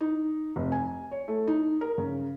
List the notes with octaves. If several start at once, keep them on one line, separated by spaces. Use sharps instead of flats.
D#4
F1
G#5
C#5
A3
D#4
A#4
C#3